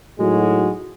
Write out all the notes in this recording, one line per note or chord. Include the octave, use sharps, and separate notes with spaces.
A2 F#3 G#3 D#4 F#4